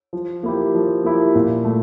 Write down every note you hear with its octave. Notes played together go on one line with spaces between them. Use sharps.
F3
A#3 E4 G4
F3
A#3 E4 G4
A#2
A3